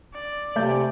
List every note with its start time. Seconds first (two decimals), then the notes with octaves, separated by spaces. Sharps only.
0.14 D5
0.56 C3 A3 E5 G#5 G6